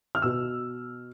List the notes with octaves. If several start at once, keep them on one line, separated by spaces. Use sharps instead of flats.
F6
B2 E6